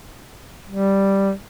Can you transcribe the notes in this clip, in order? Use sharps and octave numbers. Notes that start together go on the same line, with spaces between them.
G3